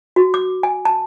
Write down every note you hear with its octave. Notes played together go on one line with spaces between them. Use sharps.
F#4
D6
G#5
A5